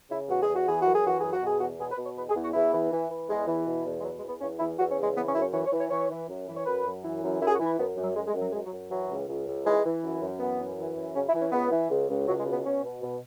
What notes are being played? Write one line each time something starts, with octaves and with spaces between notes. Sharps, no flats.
C#3 E4
E2 F#4
G#4
E2
F#4
E3 G#4
F#2 F#4
G#4
E3 F#4
F#2 G#4
F#4
B2
G#4
E2 F#4
B2 G#4
B4
B2
C#5
E2 B4
G#4
E2
F#4
E2 E4
E3
E3
E3
E2 G#3
E3
B2
E2
G#3
B2 F#3
G#3
E2
B3
E2 C#4
E2 E4
E2 F#4
C#4
C#3
G#3
E3 B3
C#4
F#2 E4
C#4
E3 C#5
C#5
E3
C#5
E3 C#5
E3
F#2
E3
C#5
F#2 B4
F#2
E3
F#2
F#2 E4
G#4
F#4
E3
E4
F#2 B3
F#2
F#3
F#2 G#3
G#3
F#2
F#3
F#2 G#3
F#3
F#2
E3 F#3
C#2
C#2
C#2
E3 G#3
E3
F#2
F#2
E3 B3
F#2
E3
F#2
C#3 C#4
E4
E3
C#4
C#2 B3
E3
C#2
C#2
C#2 F#3
G#3
B2
B3
B2 C#4
B2
B2